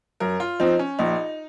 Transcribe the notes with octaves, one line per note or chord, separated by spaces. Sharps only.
F#2 A#4
F4
F3 C4 D#4
C#4
A#1 D#4